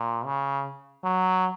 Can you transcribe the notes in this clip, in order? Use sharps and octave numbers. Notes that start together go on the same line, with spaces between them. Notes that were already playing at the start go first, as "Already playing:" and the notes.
Already playing: A#2
C#3
F#3